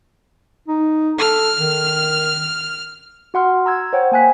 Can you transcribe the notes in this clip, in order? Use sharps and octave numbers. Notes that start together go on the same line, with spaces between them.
D#4
A4 F6
D#3
F#4 F#5 C6 F6
A#5 E6 G#6
C5 C#5 F#5 G5
A#3 G5 G#5 F#6 B6